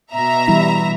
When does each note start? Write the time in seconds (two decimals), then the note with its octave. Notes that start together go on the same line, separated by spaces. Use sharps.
0.13 B2 E5 A#5
0.48 E3 G3 E4